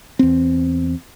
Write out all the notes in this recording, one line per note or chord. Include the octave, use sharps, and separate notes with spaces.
E2 C4